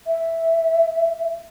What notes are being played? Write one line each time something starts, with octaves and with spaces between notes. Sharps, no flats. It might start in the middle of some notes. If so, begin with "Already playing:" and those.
E5